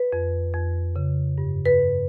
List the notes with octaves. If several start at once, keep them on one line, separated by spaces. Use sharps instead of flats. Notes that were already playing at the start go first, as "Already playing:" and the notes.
Already playing: B4
F2
F2
C#3
G2
B4
G2